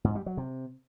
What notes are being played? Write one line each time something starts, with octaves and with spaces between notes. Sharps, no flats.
G#2
G3
F#3
C3